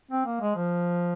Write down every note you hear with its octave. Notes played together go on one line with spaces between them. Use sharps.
C4
A#3
G#3
F3